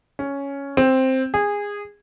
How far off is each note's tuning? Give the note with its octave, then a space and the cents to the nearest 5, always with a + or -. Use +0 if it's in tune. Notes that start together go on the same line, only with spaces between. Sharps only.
C#4 +5
C4 +5
G#4 -20